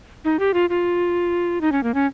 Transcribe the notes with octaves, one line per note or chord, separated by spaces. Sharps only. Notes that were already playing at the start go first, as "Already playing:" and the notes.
D#4
G4
F4
F4
D#4
C#4
A#3
C#4